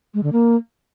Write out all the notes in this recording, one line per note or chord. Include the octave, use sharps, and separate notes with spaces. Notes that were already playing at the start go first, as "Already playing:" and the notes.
G#3
D3
A#3